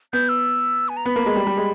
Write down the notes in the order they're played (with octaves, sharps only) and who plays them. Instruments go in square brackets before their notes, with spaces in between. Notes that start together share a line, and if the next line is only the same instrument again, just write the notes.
[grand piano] B3 [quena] G6
[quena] E6
G#5
A#5
[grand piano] B3 [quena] B5
[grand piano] A#3
G#3
G3
G3
G#3